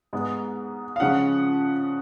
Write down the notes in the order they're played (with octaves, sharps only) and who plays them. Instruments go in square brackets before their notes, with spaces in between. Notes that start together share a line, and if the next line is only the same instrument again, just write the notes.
[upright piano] G#2 G#3 B3
F5
C#3 F3 G#3 C#4 F4 F#5